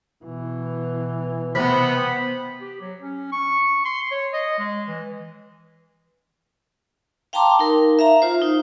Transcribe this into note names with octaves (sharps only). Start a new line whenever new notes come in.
B2 E3
C3 B3 C5 B5
G4
F#3
C#4
C#6
C6
C#5
D#5
G#3
E3
F5 G5 A5 A#5 C6 D6
D#4 A#4
E5 F5 A#5
F4 C5
D#4